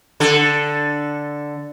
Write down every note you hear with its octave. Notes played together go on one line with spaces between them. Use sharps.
D3 A4